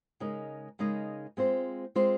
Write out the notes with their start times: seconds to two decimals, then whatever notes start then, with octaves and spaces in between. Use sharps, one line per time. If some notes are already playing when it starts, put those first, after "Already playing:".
0.20 C#3 G#3 D#4 A#4 D#5
0.79 C#3 G#3 D#4 A#4 D#5
1.37 G#3 C4 F4 C5
1.95 G#3 C4 F4 C5